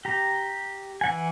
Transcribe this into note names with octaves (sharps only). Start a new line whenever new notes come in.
G4 A#5
E3 F#5 G#5